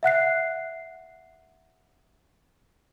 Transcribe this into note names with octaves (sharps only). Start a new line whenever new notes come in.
E5 F#5 F#6 C7